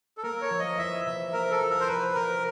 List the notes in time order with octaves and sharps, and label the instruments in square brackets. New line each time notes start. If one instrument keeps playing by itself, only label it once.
[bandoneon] A4
[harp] A#3 [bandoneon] A#4
[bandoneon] C#5
[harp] F3
[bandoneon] D#5
[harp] E2 [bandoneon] E5
[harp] C3 [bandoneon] E5
[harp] A#3 [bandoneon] A#4
[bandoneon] A4
[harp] F3
[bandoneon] A#4
C5
[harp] E2 [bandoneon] B4
[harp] C3 [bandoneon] A#4